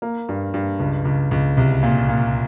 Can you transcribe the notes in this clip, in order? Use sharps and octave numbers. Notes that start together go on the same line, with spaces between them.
A#3
G2
G2
C#2
C#2
C#2
C2
A#2
A#2